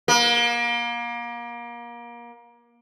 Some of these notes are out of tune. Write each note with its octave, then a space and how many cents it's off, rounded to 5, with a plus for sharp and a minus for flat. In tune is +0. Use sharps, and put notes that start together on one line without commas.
A#3 +30